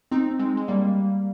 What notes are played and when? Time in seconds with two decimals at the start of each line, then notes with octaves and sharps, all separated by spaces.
0.11 C4 D#4
0.39 G#3 C4
0.57 G#3
0.68 G3 A#3